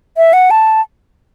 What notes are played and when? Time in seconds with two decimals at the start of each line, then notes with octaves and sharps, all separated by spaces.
0.17 E5
0.33 F#5
0.51 A5